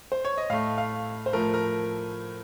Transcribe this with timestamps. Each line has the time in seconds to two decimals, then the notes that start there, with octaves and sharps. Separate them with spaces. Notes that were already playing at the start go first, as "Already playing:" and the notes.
0.12 C5
0.25 C#5
0.38 D#5
0.50 A2 A3 F5
0.78 F5
1.26 C5
1.33 A2 F3 A3 A#4
1.54 A#4